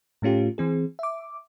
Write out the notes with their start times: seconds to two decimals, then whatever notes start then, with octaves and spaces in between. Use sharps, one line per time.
0.22 A2 A3 C#4 F4 G4
0.58 E3 C4 G#4
0.99 E5 D6